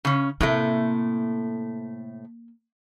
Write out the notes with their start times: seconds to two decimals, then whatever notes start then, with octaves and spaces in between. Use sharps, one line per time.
0.05 C#3 C#4
0.41 A2 C3 A3 A#3